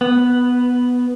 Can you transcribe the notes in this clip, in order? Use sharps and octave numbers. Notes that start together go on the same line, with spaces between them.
B3